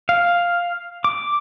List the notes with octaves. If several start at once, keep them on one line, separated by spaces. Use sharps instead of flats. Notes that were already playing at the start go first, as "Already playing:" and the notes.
F5
D6